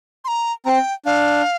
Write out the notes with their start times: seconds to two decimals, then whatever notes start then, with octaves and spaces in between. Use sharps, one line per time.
0.25 C6
0.28 A#5
0.65 C4 G5 A#5
1.05 D4 F5